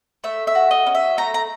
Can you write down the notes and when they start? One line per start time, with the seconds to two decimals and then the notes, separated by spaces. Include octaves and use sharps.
0.24 A3 E5
0.47 E5
0.55 F#4
0.71 D#5
0.87 C#4
0.95 E5
1.18 A3 A#5
1.34 A#5